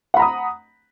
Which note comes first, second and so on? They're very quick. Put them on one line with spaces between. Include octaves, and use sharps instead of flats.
F#5 B5 A#5 D#6